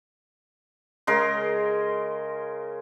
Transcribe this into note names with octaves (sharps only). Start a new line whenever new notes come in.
C#3 G#3 A#4 C6